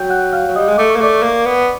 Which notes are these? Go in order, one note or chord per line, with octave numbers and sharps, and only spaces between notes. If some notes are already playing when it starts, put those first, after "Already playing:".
Already playing: F#3 G5 G6
F#5 F#6
F5 F6
F#3
G3 D#5 D#6
G#3
A3 D6
C#6
A#3
A3 D5 D6
A#3
B3